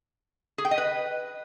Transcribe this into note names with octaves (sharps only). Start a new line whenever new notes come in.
G#4
G5
D#5
B4